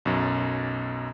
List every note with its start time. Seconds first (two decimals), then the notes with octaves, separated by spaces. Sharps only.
0.05 B1 F#2